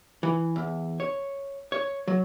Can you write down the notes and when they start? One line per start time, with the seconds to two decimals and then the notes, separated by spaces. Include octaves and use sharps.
0.23 E3
0.56 E2
1.00 C#5
1.72 C#5
2.08 F#3